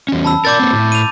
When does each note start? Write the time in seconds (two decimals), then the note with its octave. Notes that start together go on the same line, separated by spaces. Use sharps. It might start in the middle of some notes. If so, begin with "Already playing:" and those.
0.09 E2 C#4
0.25 A5 B5 E6
0.45 A#4 D5 D6 G6 A6
0.60 A#3 C4
0.73 A2
0.92 D#7 F7